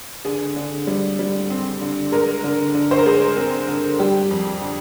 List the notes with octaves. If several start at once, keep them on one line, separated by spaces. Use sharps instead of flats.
D3 G#4
D3
G3
G3
C4
D3
G#3 A#4
D3
D3
C5
A#4
G#3 G#4
C4
D3
G3 G4
F2
D3